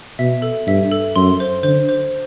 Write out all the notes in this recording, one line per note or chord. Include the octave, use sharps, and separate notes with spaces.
B2 E5
A4
G2 E5
A4
F#2 C6
C5
D3 C5
C5